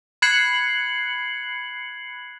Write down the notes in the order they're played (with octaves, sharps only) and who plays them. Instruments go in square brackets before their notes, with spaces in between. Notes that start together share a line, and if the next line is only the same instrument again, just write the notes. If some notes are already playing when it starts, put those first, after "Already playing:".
[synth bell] B5 F#6 G#6 C7 C#7 F#7